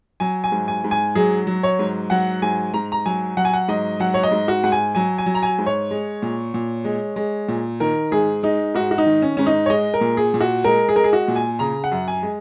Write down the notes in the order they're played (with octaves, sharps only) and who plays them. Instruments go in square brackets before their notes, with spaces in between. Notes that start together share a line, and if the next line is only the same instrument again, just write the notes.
[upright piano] F#3 G#5
G#5
G#2
G#5
G#2
G#5
F#3 G#4
F#3
C#5
G#2
F#3 F#5
G#2 G#5
G#2 A#5
A#5
F#3 G#5
F#3 F#5
G#5
F#5
G#2 D#5
F#3 F#5
C#5
D#5
G#2
F#4
G#2 F#5
G#5
F#3 G#5
G#5
F#3
A#5
G#5
G#2
C#5
G#3
A#2
A#2
G#3
G#3
A#2
D#3 A#4
G#2 G#4
G#3 D#4
G#2 F#4
F#4
D#4
D#3
C#4
G#2 C#4
D#4
C#5
G#3 D#5
A#4
A#2
G#4
A#2
F#4
G#3 A#4
G#4
G#3 A#4
G#4
F#4
A#2
G#5
C#3 A#5
F#5
F#2
G#5
G#3